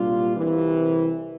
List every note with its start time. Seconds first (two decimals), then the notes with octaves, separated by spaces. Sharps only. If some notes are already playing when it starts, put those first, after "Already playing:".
Already playing: C2 A#2 G3 D4 F4
0.36 C2 C3 E3